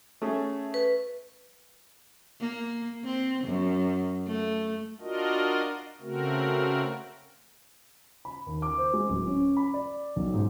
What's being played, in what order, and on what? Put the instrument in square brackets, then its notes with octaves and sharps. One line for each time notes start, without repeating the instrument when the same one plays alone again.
[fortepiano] A3 C#4 G#4
[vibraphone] B4
[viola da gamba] A#3
C4
F#2
A3
[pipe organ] D4 F4 F#4 A#4 D#5
C#3 A3 C4 F#4 A#4
[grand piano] B5
D#2
D6
C5
G#3
D1
C#4
B5
D5
B1
G#2